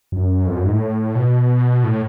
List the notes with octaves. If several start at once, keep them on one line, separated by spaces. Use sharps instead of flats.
F#2
F2
F#2
G#2
A2
B2
A2